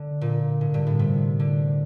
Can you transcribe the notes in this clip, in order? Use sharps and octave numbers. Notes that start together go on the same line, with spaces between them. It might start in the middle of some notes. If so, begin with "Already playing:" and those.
Already playing: D3
A#2
A2
G2
A2
C3
D3